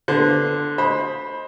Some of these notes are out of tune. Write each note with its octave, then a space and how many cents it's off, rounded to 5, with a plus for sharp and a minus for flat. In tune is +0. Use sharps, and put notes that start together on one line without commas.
D3 +0 B3 -5 C5 +0
C5 +15 D#5 +5 B5 -5